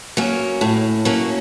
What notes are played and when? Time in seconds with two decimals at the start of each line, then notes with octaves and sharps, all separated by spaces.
0.17 F#3 A#3 C#4
0.61 A2
1.05 F#3 A#3 C#4